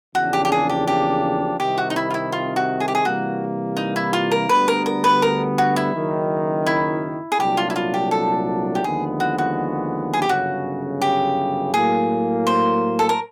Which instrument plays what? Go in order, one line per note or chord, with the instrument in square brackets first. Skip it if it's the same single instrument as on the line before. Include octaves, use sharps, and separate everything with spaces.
[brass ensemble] E2 C#3 F3 A#3 D4 [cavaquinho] F#4
[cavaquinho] G4
G4
G#4
G4
G4
[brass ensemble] C2 C3 D#3 [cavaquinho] G4
[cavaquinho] F#4
D#4
E4
F4
E4
F4
F#4
G#4
G4
G#4
[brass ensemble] C3 E3 G3 A#3 [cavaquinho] F#4
[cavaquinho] D#4
E4
F4
A#4
[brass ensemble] D2 D3 G3 B3 [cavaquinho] B4
[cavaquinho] A#4
A#4
B4
A#4
F#4
E4
[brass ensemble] F#1 F#2 D#3
[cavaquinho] E4
G#4
[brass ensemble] C2 A#2 F#3 A3 D4 [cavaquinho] G4
[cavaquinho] F4
E4
F4
G4
A4
G4
[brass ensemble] D#2 D3 F3 G#3 B3 [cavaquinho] G#4
[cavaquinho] F#4
F#4
G#4
G4
[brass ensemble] G1 F#2 C#3 [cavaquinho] F#4
[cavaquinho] G4
[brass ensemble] A2 F#3 A#3 [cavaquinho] G#4
[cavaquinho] C5
A4
A#4